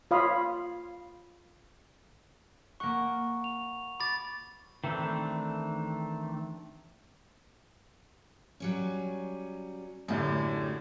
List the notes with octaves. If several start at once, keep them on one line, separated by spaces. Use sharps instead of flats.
F4 C#5 F5 B5 D#6
A#3 F#5 C#6
F7
B5 D6 A6
D#3 E3 A3 C4 D4
F#3 G3 C#4
F#2 A2 D3 G4